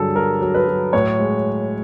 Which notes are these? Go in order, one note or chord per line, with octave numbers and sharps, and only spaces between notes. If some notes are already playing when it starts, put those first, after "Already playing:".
Already playing: G2 D3 F#3 G#4 A4
F#3 A#4
F#3
B4
F#3
A2 C#5
G#3